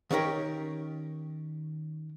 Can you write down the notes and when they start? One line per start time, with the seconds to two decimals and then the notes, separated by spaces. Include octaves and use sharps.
0.11 D#3 C#4 G4 A#4 C#5